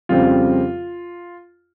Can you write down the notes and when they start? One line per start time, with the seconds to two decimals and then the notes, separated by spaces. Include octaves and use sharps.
0.09 F2 C#3 G3 C4 F4